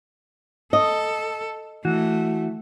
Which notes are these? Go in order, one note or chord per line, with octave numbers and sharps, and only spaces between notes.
A4 D#5
E3 A3 F#4